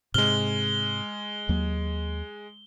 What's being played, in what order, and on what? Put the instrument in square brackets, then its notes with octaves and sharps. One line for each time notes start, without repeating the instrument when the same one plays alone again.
[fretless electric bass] G#2 C3 [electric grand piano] G#3 F6 [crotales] G7
[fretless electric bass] D#2 F#3 A#3